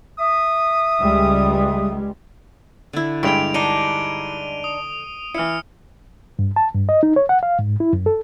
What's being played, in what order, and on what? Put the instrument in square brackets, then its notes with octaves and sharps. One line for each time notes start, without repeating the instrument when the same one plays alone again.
[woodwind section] E5 D#6
[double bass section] C#2 G3 G#3
[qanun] D3 E4
[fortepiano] G2 G#3 [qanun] G4 G5 [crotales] D7 F7
[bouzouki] D4 D#4 [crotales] D#7 G7
[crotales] D#6
[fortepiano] E3 E4 [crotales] F6 C#7
[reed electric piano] G2
A5
G2
D#5
D#4
C#5
F#5
F5
G#2
E4
F#2
A4